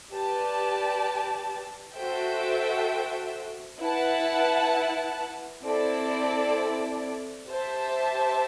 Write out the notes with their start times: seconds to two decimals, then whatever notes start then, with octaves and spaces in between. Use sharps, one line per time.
0.13 G4 B4 D5 A5
1.96 F#4 A4 C5 E5 G5
3.80 E4 B4 F#5 A5
5.64 C4 E4 A4 D5
7.48 G4 C5 E5 A5